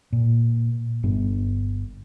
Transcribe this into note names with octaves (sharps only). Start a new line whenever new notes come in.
A#2
G1 G2 B3